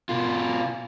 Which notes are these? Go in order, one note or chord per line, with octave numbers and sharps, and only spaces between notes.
B2 F4